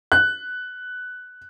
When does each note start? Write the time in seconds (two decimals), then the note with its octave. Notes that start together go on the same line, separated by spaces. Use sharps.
0.12 F#6